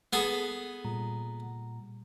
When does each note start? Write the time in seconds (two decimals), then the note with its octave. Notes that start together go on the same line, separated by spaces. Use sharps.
0.13 B3 G#4 A4
0.85 A#2 G3 A#5